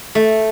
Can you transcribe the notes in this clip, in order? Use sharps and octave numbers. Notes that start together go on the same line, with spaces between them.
A3